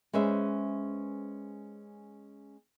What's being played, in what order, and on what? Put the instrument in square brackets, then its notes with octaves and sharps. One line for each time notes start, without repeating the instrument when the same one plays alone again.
[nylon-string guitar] G#3 C#4 B4 C5 E5